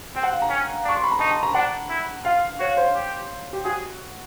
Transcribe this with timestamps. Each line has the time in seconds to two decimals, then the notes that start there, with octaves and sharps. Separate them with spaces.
0.15 C4 G5
0.23 F#5
0.32 F5
0.42 A#5
0.49 C#4
0.84 D4 C#6
0.96 C6
1.04 B5
1.11 A#5
1.19 D#4 A5
1.31 A5
1.43 A#5
1.54 D4 F#5
1.90 E4
2.25 F4 F5
2.59 F#4 C#5
2.77 C5
2.95 G4
3.53 G4
3.64 F#4 G#4